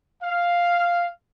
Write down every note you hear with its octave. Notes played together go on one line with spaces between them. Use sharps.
F5